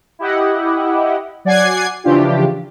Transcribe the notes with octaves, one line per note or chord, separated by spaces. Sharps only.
E4 G4 D#5 F#5
F#3 D5 F#5 G#5 G#6 C7
C#3 E3 F3 D4 F4 G4